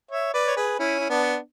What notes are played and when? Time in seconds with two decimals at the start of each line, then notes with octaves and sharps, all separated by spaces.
0.11 C#5 E5
0.34 B4 D5
0.47 C#5
0.56 G#4 B4
0.79 C#4 E4
1.00 E4
1.09 B3 D4